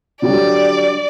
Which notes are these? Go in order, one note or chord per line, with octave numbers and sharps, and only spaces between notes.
D3 F#3 G3 D5